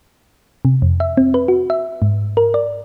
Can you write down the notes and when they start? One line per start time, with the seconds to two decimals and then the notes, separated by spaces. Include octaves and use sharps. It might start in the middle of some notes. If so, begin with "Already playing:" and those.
0.65 C3
0.82 F2
1.00 E5
1.17 C4
1.34 B4
1.48 F#4
1.70 E5
2.02 G#2
2.37 A#4
2.54 D5